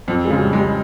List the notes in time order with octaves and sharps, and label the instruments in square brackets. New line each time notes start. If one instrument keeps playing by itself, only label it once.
[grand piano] F2 [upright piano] C4
[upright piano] G#3
[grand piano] C#3
[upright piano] G#3
G3
[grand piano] G#3
[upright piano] G3